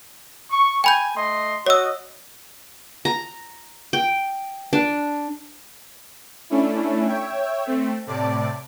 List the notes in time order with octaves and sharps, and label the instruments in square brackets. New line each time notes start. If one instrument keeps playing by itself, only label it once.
[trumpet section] C#6
[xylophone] G5 B5 G6 [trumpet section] G#5
[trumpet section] A3 D#5 C6
[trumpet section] F#4 D#5 [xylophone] C#5 E6
[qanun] A#5
G5
D4
[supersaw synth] A3 C#4 D4 E4
C#5 E5 G5
A3 C4
A2 C3 D5 A5 D6